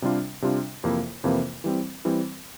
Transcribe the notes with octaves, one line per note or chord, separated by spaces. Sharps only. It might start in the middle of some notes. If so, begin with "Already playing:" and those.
C3 G3 D4 F4
C3 G3 D4 F4
F2 C3 E3 A#3 E4
F2 C3 E3 A#3 E4
E3 G3 C4
E3 G3 C4